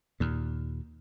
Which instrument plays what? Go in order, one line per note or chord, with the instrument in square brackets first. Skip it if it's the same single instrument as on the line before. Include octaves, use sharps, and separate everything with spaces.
[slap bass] D#2 A#2